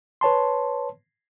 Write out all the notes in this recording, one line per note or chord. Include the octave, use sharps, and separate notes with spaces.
B4 C#5 A5 C6